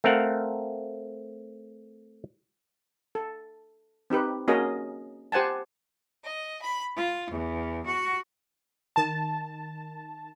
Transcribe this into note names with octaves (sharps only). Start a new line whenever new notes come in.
A3 C4 A#4 F5 F#5
A4
C4 D#4 G4 B4
A#3 C#4 F#4 G#4 A#4 D#5
G4 C5 F#5 G#5 A5
D#5
B5
F4
E2
F#4
D#3 A5